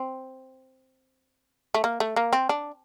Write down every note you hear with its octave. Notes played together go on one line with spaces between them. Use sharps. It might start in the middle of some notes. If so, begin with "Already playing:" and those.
Already playing: C4
A3
A#3
A3
A#3
C4
D4